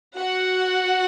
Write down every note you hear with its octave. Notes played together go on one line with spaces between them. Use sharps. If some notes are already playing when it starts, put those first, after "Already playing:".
F#4 F#5